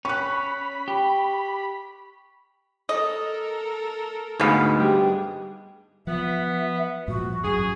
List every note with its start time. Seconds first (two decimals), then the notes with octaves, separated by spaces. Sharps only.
0.05 C#4 B5 C#6 F#6
0.88 G4
2.89 A4 A#4 D#5
4.40 D2 G#2 G#3 B3 F5
4.78 G2 D4 G4 G#4
6.07 F3 B3 E5
7.08 G2 A#2 F3 F#4
7.43 G#1 F#2 G#4